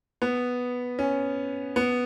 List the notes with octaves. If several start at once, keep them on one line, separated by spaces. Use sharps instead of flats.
B3
C#4
B3